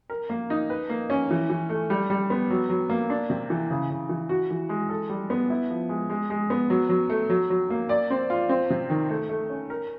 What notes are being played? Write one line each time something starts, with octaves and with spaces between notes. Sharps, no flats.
A#4
A#3
D#4
B4
A#3
C#4
E3
E3
A3
G3
G3
B3
F#3
F#3
A#3
D4
C3
E3
C#3
C#3
E3
F#4
E3
G#3
A4
G3
B3
E4
F3
G#3
G#3
G#3
B3
F#3
F#3
A3
F#3
F#3
A#3
D5
C4
F4
C4
C3
D#3
A3
A3
C#4
A#4